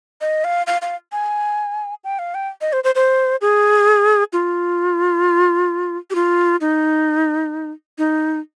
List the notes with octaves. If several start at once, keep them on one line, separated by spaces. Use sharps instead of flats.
D#5
F5
F5
F5
G#5
G5
F5
G5
D#5
C5
C5
C5
G#4
F4
G4
F4
D#4
D#4